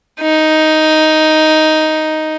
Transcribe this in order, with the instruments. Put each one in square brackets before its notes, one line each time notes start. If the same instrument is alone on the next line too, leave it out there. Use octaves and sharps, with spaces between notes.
[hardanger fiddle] D#4